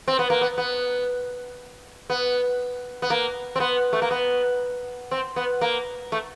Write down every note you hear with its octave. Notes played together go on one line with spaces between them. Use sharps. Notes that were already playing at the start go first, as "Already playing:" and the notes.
C4
B3
A#3
B3
B3
B3
B3
A#3
C4
B3
A3
A#3
B3
C4
B3
A#3
A3